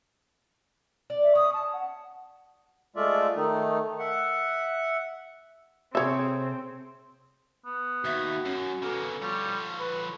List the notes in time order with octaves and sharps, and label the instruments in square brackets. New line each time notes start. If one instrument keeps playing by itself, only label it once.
[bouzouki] D5
[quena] E5
[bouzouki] C#4 [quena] D#6
[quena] A5
F#5
[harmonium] G#3 A3 F4 D5 E5
D#3 A3 D#4
E5 F#5
[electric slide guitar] C3 G#4 A4 [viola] C4 [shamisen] C#5 E5
[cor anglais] B3
[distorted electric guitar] D#2 [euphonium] F#4 [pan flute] E5
[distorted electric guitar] F#2 [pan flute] C#4
[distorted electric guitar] C#3 B3 [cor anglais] A#3 [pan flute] A4
[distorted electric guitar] F3 C#5 [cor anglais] G3 [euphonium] F4
[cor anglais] B4